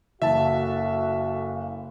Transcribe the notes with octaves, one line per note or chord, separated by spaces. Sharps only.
F#1 F#4 A4 E5 F5 A5